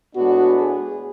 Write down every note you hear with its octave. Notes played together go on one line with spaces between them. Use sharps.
A2 G#3 B3 D4 F#4
G#4